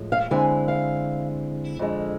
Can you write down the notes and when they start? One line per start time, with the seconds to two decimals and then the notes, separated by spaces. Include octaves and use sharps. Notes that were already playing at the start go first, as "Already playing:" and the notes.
Already playing: A2 F3 G#3
0.12 F5
0.31 D3 G#3 C4 E4 G#5
0.68 F5
1.79 F2 D3 G#3